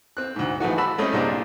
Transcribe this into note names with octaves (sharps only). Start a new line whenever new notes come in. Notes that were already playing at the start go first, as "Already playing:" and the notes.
C4 F#6
D2 G#2
E3 F3 A3 D#4 F#4
F#4 A5 B5 E6
G#3 A3 C4 C#4 D#5
C2 G2 A#2 D4 C5 D#5